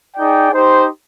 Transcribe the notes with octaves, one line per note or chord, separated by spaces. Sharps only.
D#4 G#4 D5 G5
D#4 G4 C5